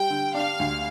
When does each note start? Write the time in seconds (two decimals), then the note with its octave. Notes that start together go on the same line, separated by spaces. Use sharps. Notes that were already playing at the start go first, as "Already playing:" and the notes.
Already playing: G3 G5
0.10 D3
0.34 D4 F5
0.59 D2